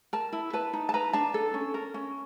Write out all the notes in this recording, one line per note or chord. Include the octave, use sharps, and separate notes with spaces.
A#4 A5
E4
B4 A5
D#4
A5
B4 A#5
D4 A5
A4
C#4
A#4
C#4